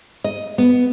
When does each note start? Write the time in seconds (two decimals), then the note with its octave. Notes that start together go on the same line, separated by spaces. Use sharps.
0.24 D#5
0.58 B3